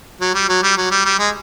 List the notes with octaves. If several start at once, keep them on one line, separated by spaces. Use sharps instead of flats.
F#3
G3
F#3
G3
F#3
G3
G3
G#3